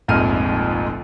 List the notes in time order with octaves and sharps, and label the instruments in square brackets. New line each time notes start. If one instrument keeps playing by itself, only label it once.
[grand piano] F1 A#1 F2 G#2 F6 D#7